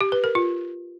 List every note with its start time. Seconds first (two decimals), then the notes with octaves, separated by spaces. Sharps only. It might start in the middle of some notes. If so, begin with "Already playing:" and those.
0.01 G4
0.12 B4
0.24 A#4
0.35 F4